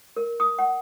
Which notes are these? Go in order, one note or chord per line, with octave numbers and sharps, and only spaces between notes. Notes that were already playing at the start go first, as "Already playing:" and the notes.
A#4
D#6
F#5